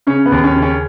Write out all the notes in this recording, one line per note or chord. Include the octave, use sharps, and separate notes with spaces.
C#3 C#4
B3
D#2
C#4
C#3
C#4